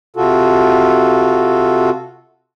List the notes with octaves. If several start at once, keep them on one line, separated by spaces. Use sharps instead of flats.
C3 F4 F#4 A4